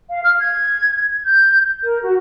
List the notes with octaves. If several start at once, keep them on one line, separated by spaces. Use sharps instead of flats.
F5
F6
G#6
G6
A#4
F#4